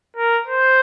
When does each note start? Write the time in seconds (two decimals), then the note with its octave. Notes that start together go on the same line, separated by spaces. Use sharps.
0.17 A#4
0.47 C5